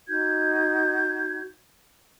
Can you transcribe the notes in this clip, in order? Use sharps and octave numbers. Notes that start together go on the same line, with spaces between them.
D#4 F#4 G6 G#6